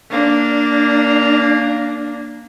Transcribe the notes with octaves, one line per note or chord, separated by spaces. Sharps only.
A#3 D4